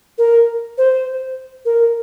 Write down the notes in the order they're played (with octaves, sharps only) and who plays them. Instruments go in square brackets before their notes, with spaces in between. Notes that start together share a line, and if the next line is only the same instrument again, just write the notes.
[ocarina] A#4
C5
A#4